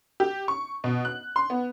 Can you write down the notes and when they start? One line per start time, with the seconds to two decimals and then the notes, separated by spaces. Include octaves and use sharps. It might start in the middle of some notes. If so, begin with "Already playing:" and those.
0.20 G4
0.48 C#6
0.84 B2
1.05 F#6
1.36 C6
1.50 B3